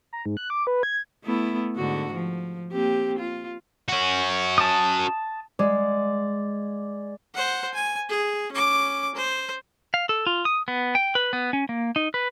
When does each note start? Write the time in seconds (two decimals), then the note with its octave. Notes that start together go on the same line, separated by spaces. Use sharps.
0.13 A#5
0.26 G#2
0.37 F#6
0.50 D6
0.67 B4
0.83 G#6
1.24 A3 B3 E4
1.76 G#2 D3 F#4
2.13 F3
2.72 A#3 C4 G4
3.19 F4
3.89 C#4 F#4
4.58 A5 D#6
5.59 G#3 D5 F5
7.35 C5 F#5
7.74 G#5
8.09 G#4
8.52 C#4 D6
9.15 C5
9.94 F5
10.09 A4
10.27 F4
10.45 D#6
10.68 B3
10.95 G5
11.15 B4
11.33 B3
11.53 C#4
11.69 A#3
11.96 D#4
12.14 B4